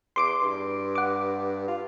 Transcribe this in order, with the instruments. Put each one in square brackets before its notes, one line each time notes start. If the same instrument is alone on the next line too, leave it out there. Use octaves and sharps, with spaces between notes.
[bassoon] E2 [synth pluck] C6 D6 D7
[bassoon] G2
[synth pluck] F#5 D6
[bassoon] F4